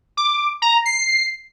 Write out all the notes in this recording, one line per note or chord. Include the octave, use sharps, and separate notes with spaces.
D6
A#5
C7